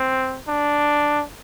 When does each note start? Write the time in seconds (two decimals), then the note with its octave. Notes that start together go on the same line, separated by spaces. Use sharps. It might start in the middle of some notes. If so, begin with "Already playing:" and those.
Already playing: C4
0.48 D4